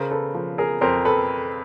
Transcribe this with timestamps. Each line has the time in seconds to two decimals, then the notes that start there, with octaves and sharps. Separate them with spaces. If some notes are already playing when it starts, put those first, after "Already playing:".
Already playing: C#3 A#4 C5
0.11 A4 B4
0.34 F3
0.58 G#4 A#4
0.81 F2 A#4 C5
1.05 A4 B4